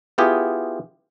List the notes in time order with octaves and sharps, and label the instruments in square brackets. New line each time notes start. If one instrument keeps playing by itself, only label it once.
[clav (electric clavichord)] B3 E4 F4 G4 G#4